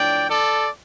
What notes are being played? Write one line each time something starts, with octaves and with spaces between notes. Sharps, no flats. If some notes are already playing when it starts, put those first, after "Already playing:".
Already playing: A2 F3 D4 D5 G5
A4 D5